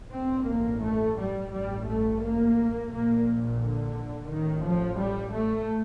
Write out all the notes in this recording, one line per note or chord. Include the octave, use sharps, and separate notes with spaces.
A1 G2 C4
A#3
A3
G3
A1 G2 G3
A3
A#3
A#1 A#2 A#3
D3
A1 A2 D#3
F3
G3
A3